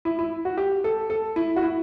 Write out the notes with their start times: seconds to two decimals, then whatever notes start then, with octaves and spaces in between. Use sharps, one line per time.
0.05 E4
0.19 E4
0.45 F#4
0.58 G4
0.84 A4
1.10 A4
1.36 E4
1.56 F#4
1.62 E4